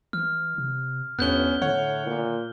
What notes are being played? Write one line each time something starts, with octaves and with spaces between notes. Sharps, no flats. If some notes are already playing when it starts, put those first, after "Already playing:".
E3 F6
C3
G1 E2 B3 C#4 F#6 G6 G7
A2 D3 C#5 F#5
A#2